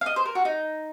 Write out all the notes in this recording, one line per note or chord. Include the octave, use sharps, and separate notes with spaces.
F5
D#5
C5
A#4
F#4
D#4